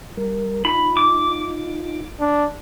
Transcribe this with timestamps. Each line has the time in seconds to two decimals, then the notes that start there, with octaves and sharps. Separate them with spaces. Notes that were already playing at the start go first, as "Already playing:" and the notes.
0.17 G3 A#4
0.65 D#4 F4 B5
0.97 D6
2.20 D4